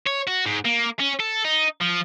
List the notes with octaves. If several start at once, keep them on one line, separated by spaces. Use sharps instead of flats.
C#5
F#4
G#2
A#3
C#4
A4
D#4
F3